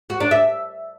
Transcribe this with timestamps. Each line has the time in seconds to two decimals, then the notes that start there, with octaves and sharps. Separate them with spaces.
0.10 F#4
0.20 D4
0.31 E5